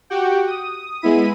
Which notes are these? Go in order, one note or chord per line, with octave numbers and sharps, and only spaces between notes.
F#4 G4 F#5 G5
D#6
G#3 B3 E4 B5 D#7